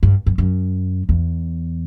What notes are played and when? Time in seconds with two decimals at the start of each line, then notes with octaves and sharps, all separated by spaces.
0.03 G2
0.26 F#2
0.38 F#2
1.09 E2